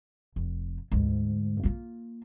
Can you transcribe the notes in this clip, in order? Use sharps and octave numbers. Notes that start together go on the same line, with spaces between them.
F1
D2 G#2
A#3 F4